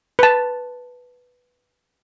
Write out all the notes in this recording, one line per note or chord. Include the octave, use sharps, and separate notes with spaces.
B4 A5